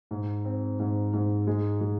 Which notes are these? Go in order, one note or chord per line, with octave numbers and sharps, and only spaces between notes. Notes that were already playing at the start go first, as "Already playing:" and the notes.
G#2
C4
G#2
G#2
G#3
G#3